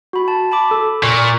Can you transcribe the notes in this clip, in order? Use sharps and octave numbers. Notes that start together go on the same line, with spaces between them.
F#4 B5
A5
A5 B5 D6
A4
A#2 C#6